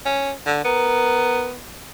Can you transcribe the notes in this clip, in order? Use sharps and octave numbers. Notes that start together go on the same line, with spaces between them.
C#4
D3
B3 A#4